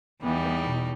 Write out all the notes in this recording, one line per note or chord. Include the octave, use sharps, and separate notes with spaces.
E2 E3 G3 B3 D#4
B2